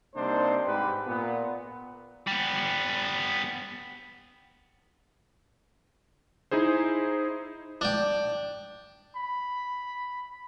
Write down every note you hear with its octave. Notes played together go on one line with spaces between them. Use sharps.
C3 G3 A#3 D4 D#4 C5
G#2 G4 B4
A#2 B3
G3 B3
D#4 E4 G#4 C5
D4 G5
B5